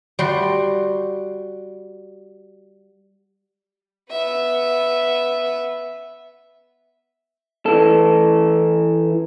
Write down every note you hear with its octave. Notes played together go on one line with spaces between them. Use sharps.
G3 F#4 C6
B3 E5
E3 A4